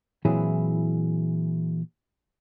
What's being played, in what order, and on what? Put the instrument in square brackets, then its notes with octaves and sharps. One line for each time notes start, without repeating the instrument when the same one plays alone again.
[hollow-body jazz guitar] A#2 E3 F#3 C4 E4 G#4